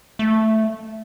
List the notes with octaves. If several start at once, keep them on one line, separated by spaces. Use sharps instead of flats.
A3